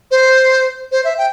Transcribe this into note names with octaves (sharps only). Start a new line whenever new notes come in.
C5
C5
E5
G5